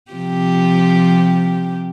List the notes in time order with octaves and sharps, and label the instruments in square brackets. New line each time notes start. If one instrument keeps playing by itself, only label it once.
[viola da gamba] C3 F3 G4